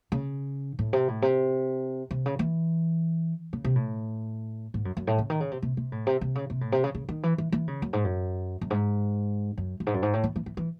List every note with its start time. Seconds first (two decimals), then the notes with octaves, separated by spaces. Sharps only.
0.12 C#3
0.79 A2
0.93 C3
1.08 A2
1.22 C3
2.11 C3
2.26 C#3
2.39 E3
3.53 C#3
3.65 C3
3.76 A2
4.74 G#2
4.85 F#2
4.97 F#2
5.07 A2
5.18 C#3
5.30 D#3
5.40 C#3
5.51 C3
5.62 C3
5.77 C3
5.92 A2
6.07 C3
6.21 C3
6.35 C#3
6.50 C3
6.61 A2
6.72 C3
6.84 C#3
6.95 C#3
7.09 D#3
7.23 E3
7.38 E3
7.52 E3
7.68 C#3
7.82 F#2
7.93 G#2
8.04 F#2
8.61 F#2
8.70 G#2
9.58 F#2
9.80 F#2
9.87 G#2
9.94 F#2
10.03 G#2
10.13 A2
10.24 E3
10.36 E3
10.46 E3
10.57 E3